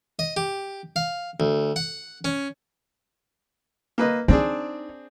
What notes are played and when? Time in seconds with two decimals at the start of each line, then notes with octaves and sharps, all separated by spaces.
0.19 D#5
0.37 G4
0.96 F5
1.40 D2
1.76 F#5
2.25 C#4
3.98 A#3 B4 D#5
4.28 C4 D4 D#4 G#4